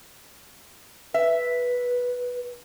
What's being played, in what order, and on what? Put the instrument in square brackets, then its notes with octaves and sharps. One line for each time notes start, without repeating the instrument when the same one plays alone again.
[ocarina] B4 [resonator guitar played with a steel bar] E5